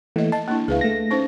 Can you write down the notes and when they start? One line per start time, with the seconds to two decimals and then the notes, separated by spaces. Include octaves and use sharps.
0.16 E3 A3 A#3 D#5
0.32 D#5 A5
0.48 A#3 D4 E4
0.68 C#2 E4 G#4 B4 F5
0.81 A3 A#6
1.11 C#4 D#4 C5